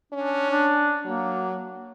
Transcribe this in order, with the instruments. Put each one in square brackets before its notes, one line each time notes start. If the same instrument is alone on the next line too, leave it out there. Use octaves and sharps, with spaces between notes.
[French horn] C#4 [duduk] D4
[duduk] D4
[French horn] F#3 [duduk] A#3